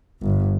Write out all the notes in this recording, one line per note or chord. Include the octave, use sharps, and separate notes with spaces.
G1